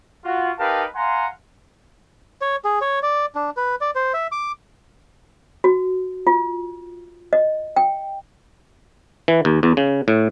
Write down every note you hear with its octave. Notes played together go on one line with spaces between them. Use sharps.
F4 F#4
D#4 G4 A#4 B4 F5 A5
F5 F#5 G#5 A#5 C6
C#5
G#4
C#5
D5
D4
B4
D5
C5
E5
D6
F#4
F4
D#5
G5
E3
D#2
E2
C#3
A2